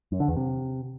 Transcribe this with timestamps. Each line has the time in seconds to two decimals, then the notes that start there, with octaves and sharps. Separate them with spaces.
0.12 F#2
0.20 D3
0.28 E2
0.37 C3